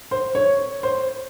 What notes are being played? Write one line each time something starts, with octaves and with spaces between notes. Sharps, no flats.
C5
C#5
C5